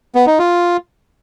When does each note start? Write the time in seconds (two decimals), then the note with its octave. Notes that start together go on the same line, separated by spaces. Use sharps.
0.15 B3
0.27 D#4
0.39 F4